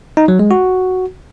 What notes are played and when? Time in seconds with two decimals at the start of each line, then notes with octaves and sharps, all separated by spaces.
0.17 D#4
0.28 F#3
0.39 G#3
0.51 F#4